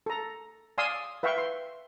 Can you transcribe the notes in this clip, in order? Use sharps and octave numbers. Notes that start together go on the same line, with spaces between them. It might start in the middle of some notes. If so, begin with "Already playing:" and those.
A4 A#5
D5 F5 G#5 C6 D#6 E6
B4 E5 F5 G5 C#6
C6